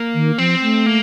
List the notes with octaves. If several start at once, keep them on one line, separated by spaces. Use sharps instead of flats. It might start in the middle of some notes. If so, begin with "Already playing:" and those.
Already playing: A#3
D#3
F3 C4
A3
A#3